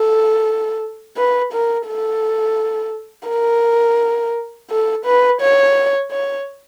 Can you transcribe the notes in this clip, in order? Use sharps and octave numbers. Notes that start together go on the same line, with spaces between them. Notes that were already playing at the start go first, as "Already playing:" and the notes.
Already playing: A4
B4
A#4
A4
A#4
A4
B4
C#5
C#5